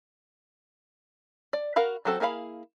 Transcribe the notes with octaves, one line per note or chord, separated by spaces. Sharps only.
D5
F#4 A#4 F5 B5
F#3 C4 F#4 A4 C5
A#3 E4 G#4 F5 B5